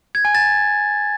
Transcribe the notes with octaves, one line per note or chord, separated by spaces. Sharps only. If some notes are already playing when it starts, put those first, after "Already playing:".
G#6
G#5
A6